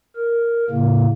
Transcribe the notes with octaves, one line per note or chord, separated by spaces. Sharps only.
A#4
A2 C#3 A#3